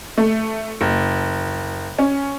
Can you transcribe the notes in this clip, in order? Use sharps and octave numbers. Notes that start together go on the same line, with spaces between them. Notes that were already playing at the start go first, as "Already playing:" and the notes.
A3
F#1
C#4